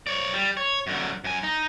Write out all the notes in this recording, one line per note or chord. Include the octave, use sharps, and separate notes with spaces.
C#5 D5
G3
C#5
F#2 D3
F#2 G#5
D#4